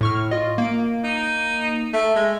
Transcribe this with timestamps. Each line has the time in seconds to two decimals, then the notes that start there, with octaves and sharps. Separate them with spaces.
0.01 A2 C#6 F6
0.31 F4 D#5
0.58 A#3 D7
1.04 D#4
1.93 A3
2.16 G#3